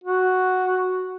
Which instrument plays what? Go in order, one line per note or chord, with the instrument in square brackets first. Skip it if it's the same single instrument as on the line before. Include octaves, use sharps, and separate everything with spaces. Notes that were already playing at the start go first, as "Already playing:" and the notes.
[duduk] F#4